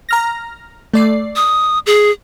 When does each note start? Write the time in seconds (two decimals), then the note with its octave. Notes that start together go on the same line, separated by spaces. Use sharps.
0.09 A#5 F6 A#6
0.94 A3 D5 C7
1.36 D#6
1.86 G#4